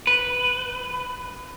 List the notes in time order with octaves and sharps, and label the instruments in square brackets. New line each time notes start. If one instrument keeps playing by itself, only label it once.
[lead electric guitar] B4